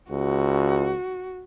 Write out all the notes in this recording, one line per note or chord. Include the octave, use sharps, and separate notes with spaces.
C#2 F#4